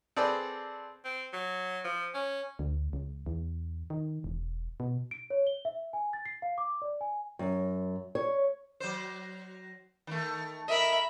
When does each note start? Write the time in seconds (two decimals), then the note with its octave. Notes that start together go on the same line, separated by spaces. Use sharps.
0.16 C4 G#4 A4 B4 C5 D5
1.05 C4
1.33 F#3
1.84 F3
2.15 C#4
2.59 D2
2.93 C#2
3.26 E2
3.90 D#3
4.24 E1
4.80 B2
5.11 D7
5.30 C#5
5.47 G7
5.65 E5
5.93 G#5
6.13 A6
6.26 C7
6.42 F5
6.58 D6
6.82 D5
7.01 G#5
7.39 F#2
8.15 C#5
8.80 F#3 C5
10.07 D#3 A3
10.68 A#4 D#5 E5 B5